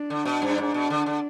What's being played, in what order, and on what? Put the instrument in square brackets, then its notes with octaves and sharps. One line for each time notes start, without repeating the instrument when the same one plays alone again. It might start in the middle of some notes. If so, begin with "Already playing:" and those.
Already playing: [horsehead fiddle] D4
[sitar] D3
B2
G2
G#2
B2
D3
D3